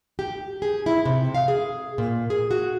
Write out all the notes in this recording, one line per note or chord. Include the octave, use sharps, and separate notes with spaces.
G4
G#4
E4
C3
F5
G#4
A#2
G#4
F#4